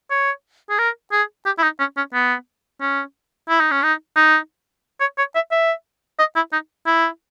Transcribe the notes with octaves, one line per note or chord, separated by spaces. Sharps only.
C#5
G#4
A#4
G#4
G4
E4
D#4
C#4
C#4
B3
C#4
E4
D#4
C#4
D#4
D#4
C#5
C#5
E5
E5
D#5
E4
D#4
E4